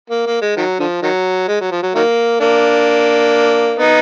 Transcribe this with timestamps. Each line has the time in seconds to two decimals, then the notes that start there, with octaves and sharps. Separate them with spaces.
0.10 A#3
0.26 A#3
0.41 G#3
0.57 D#3 F#3
0.79 D3 F3
1.02 D#3 F#3
1.48 G#3
1.60 F#3
1.71 F3
1.82 F#3
1.95 D#3 F#3 A#3
2.40 A#3 D4
3.79 B3 D#4